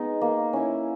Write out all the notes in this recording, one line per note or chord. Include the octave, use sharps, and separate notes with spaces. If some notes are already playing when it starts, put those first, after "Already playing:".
Already playing: G#3 B3 D#4
A#3
C#4 E4